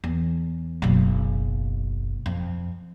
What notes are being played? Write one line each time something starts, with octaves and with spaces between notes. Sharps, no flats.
E2
F#1 B1
F2